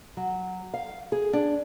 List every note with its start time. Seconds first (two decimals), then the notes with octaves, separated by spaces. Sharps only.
0.17 F#3
0.74 F5
1.12 G#4
1.33 D4